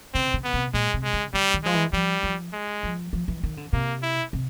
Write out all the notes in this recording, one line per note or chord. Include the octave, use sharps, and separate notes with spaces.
C#3 C4
C#3
B3
C3
A#2 G#3
C3
G#3
C#3
D3 G3
D#3
F3 G#3
E3
F3 G3
F3
G#3
F3
F3
E3
D#3
D3
C3 A#3
E4
C3